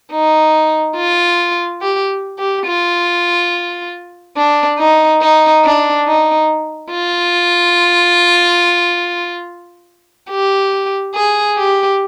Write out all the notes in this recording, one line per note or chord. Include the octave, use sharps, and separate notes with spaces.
D#4
F4
G4
G4
F4
D4
D#4
D#4
D4
D#4
F4
G4
G#4
G4